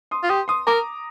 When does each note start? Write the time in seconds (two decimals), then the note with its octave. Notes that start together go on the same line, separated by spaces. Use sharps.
0.11 C6 D#6
0.23 F4
0.29 G4 C6 D#6
0.48 C6 D#6
0.67 A#4 A#5 D6